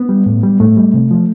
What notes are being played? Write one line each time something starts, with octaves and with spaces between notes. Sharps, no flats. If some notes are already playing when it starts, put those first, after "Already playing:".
Already playing: B3
G3
A2
G3
A2 A3
G3
C3
F3